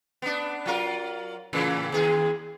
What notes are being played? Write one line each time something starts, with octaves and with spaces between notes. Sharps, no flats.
B3 D4
F#3 F4 A#4
A2 C#3 E3
D#2 G#4